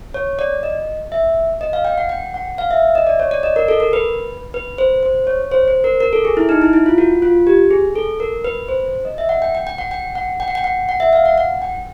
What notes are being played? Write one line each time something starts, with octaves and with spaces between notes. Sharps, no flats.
C#5
D5
D#5
E5
D#5
F5
G5
F#5
G5
F#5
F5
E5
E5
D#5
D5
C#5
D5
D#5
A#4
A4
A#4
B4
B4
C5
C5
C#5
C5
C5
A#4
A#4
A4
G#4
E4
D#4
E4
E4
F4
F#4
F4
G4
G#4
A4
A#4
B4
C5
D#5
E5
F#5
G5
G5
G5
F#5
G5
F#5
G5
F#5
G5
F#5
F#5
E5
F5
F#5
F#5
G5